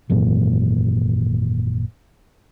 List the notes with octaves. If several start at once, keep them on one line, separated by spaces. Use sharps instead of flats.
G#1 F#2 A#2 E3